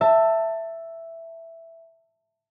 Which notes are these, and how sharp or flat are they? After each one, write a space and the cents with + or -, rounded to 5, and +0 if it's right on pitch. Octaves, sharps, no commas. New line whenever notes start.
E5 +5 A5 +20